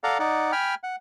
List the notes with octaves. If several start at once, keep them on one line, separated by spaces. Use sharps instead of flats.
A4 D5 F5 F#5 A#5
D#4 D5 F#5
G5 G#5 B5 F6
F#5